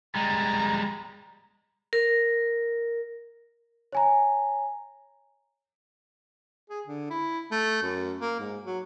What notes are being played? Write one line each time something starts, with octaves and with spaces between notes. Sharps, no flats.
G3 G#3 A#5
A#4
C#5 G#5 A#5
G#4
D3
E4
A3
F#2
A#3
G#2
F#3